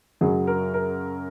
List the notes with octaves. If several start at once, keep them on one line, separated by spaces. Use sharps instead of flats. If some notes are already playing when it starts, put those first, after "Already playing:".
F#2 C#3 F#3 G#4
A#4
A#4